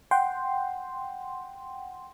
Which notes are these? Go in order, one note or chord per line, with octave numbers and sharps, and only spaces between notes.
F#5 G5 C6